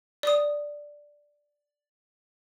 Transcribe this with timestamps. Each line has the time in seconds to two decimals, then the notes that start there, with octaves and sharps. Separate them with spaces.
0.23 D5 D#6